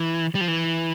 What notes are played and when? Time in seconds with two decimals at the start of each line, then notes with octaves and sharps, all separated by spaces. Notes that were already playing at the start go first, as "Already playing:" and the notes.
Already playing: E3
0.35 G3
0.41 F3
0.48 E3